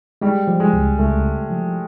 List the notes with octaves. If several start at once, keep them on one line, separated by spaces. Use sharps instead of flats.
G3 G#3
F3
G#3
C#2
C#2 A3
C#3
F3